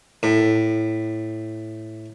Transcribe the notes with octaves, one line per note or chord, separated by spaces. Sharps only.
A2